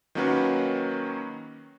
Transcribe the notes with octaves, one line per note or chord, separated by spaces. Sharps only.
D#3 F#3 A#3 C#4 F#4 B4